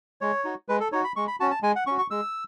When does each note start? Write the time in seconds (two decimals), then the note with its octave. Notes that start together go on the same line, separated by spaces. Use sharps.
0.21 G#3 C#5
0.44 D#4 F#4
0.69 G#3 B4
0.80 A4
0.92 D#4 F#4 C#5
1.04 B5
1.16 G#3 C#6
1.28 B5
1.40 C#4 F#4 A5
1.51 A5
1.63 G#3 G#5
1.76 F#5
1.87 C#4 F#4 C#6
1.98 C#6
2.11 G#3 E6